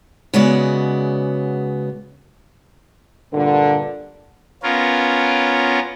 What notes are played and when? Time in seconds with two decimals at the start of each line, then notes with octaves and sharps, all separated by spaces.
0.34 C#3 G#3 B3 F#4 D5
3.33 G2 A#2 D3
4.63 B3 C#4 F4 A#4